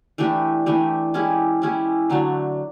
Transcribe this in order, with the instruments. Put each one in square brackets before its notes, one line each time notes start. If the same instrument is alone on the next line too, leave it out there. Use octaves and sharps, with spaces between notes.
[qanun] E3 A3 D4 G4
E3 A3 D4 G4
G#3 C#4 E4 G4
G#3 C#4 E4 G4
D3 F#3 A3 D4